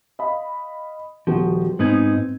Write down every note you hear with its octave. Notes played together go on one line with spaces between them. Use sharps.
D#5 F5 B5
D#1 F3 B3 F#4
G#2 B3 C4 D#4 G#6